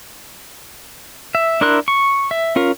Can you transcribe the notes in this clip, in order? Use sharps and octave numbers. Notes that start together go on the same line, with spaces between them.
E5
D4 E4 A#4 C6 F#6
C#6
E5
C#4 F4 A#4